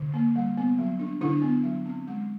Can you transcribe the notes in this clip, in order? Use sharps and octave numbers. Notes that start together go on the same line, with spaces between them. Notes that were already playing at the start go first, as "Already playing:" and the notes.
Already playing: D3
A#3
G3
B3
F#3
D4
D3 D4 E4
B3
F#3
C4
G#3